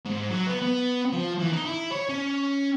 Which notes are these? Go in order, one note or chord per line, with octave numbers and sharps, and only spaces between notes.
G#2
F#3
B3
B3
F3
E3
D#4
E4
C#5
C#4